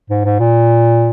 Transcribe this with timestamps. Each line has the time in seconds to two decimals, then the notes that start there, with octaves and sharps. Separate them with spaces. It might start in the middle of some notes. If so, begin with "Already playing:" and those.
0.10 G#2
0.24 G#2
0.39 A#2